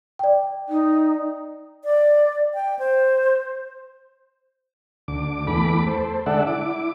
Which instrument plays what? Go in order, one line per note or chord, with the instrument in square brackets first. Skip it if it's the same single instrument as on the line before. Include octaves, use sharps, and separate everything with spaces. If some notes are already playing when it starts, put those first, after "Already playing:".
[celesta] D5 G5
[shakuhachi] D#4
[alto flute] D5
G5
C5
[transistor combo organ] D2 D6
E2 A3 B5 D6
A4 C5
D3 G#3 A4 D5 E5 F#5
E4 D6